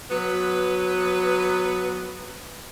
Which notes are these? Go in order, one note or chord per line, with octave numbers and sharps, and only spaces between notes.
F#3 B3 B4